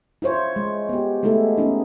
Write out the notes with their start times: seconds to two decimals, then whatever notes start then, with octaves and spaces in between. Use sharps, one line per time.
0.22 E4 F4 C5 C#5
0.56 G#3
0.89 B3 G4
1.23 G#3 A3 B3 E4 A4
1.57 B3 C#4 D#4